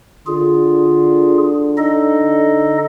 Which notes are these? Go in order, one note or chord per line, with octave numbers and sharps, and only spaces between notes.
D3 F4 G#4
D#4 A4 D#5